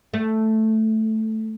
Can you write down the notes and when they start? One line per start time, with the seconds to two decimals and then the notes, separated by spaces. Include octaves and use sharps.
0.14 A3